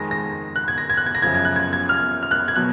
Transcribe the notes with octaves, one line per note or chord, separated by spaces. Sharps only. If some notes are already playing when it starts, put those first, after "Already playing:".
Already playing: F2 D#3 G#3 A#6
A#6
F#6
G#6
A#6
G#6
F#6
G#6
A#6
F#2 C#3 F3 G#6
G#6
F#6
G#6
G#6
F6
F6
F#6
G#6
B2 F#3 F#6